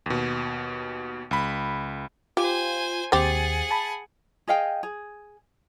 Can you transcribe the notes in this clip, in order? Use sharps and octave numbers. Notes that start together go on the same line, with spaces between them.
D#2 B2
C#2 B5
F4 G4 C5 G#5
D#2 C4 G4 G#4 F#5 A6
A5 B5
G#4 D#5 F5 G5
G#4